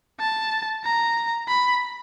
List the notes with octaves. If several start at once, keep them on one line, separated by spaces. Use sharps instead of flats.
A5
A#5
B5